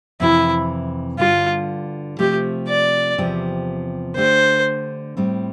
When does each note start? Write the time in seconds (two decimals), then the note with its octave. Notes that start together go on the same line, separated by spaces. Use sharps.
0.20 F2 C3 E3 E4
1.19 G2 D3 G3 D4 F4 A4
2.19 C3 F3 A3 G4
2.68 D5
3.18 E2 C3 F3 C4 G4
4.17 D3 A3 D4 G4 C5
5.17 A2 G3 C4